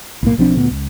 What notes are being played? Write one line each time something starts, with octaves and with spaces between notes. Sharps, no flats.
B1 A2 A#3
B1 F3 C4 D4
D2 A#2 B3
C#2